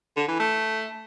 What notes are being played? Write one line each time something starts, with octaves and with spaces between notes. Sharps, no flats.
D3
E3
A3